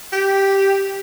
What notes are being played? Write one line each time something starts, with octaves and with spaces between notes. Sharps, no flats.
G4